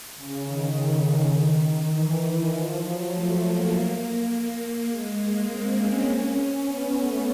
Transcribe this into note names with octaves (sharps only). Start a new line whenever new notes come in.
C#3
D#3
D#3
E3
F3
F#3
A3
A#3
A#3
G#3
A#3
C4
C#4
B3
A3